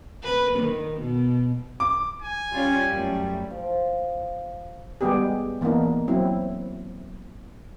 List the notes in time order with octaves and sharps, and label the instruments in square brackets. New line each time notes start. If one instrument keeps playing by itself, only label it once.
[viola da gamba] B4
D#3
B2
[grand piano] D6
[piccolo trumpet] G#5
[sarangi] G3 [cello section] C#4 F4
[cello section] F#2 A3
[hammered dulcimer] F3
[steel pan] G3 G#3 B3 G4 G#4
E3 A#3 B3 D4 D#4
F#3 C4 E4